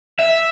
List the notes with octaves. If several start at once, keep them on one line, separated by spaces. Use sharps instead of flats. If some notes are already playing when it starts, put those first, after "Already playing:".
E5